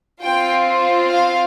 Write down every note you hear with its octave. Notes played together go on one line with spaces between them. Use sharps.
C4 F4 G5
F5